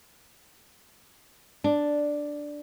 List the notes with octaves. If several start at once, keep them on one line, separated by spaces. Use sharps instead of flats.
D4